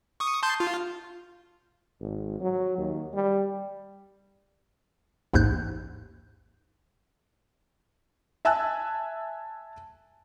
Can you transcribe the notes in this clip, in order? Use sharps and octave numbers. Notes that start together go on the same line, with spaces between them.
C#6 D#6
A5 C6 G6
F4
G#1
F#3
D#2
G3
A1 D#2 G#2 F#6 G6
E5 G#5 A5 E6 F#6